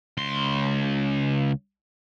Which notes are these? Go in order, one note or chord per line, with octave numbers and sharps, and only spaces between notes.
C#2 C6